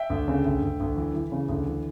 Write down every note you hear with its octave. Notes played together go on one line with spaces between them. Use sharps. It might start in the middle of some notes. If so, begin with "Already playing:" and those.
Already playing: E5 G5
D2
C#3
D2
D2
D2
E3
E3
C#3
D2
E3